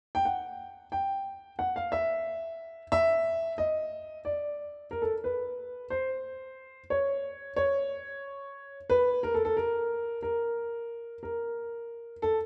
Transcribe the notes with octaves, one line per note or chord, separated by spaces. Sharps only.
G5
F#5
G5
F#5
F5
E5
E5
D#5
D5
A#4
A4
B4
C5
C#5
C#5
B4
A#4
A4
A4
A#4
A#4
A#4
A4